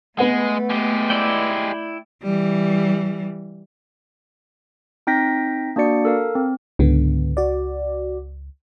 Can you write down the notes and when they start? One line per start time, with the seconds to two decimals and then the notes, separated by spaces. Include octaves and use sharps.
0.19 G#3 A3 B3 B4 F#5
0.70 G#3 G4
1.10 E4 D5 G5
2.23 E3 G3
5.07 C4 D#4 G5 G6 A#6 B6
5.76 A#3 D4 F#4 D5 C#7
6.05 A4 A#4 F5
6.35 C4
6.79 C#2 G#2 D3 B3
7.37 F#4 D5